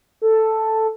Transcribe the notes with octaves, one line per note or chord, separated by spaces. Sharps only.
A4